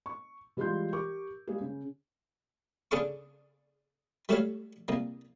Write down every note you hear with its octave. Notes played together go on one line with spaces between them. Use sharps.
C#6
E3 G3 G#3 F4 C6 G6
G4 A#4 C#6 D6
G3 G#3 A#3 G#4
C#3
C#3 D4 G#4 A4 F5 C#6
G3 A3 F#4 A4 C#5 F5
C2 A#3